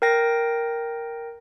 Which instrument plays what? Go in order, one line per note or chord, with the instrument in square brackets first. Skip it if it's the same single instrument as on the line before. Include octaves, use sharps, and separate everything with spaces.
[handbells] A#4 G5 A#6